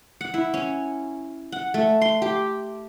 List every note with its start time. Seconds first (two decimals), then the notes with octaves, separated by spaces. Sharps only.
0.21 F#5
0.34 E4
0.54 C#4
1.52 F#5
1.74 A3
2.01 C6
2.22 G4